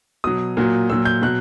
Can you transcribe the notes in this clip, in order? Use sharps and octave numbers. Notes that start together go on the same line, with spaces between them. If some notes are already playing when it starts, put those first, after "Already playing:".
B2 F#3 D#6
A#2 F#3
A#2 F#3 E6
G6
B2 F#3 F#6